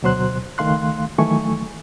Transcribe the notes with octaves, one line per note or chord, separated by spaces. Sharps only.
D2 B2 F#3 C5 C6 F#6
C#2 D#3 A3 F5 C6 F#6
D#3 E3 F#3 A3 G#5 C#6